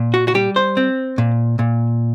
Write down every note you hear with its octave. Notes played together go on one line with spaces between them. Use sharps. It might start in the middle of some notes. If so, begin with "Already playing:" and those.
Already playing: A#2
F#4
F#4
G3 G4
C5
C4
A#2
A#2